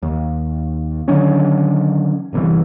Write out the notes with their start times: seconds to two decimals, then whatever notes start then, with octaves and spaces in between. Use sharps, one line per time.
0.02 D#2
1.08 D3 D#3 F#3 C#4
2.33 G1 C2 A#2 E3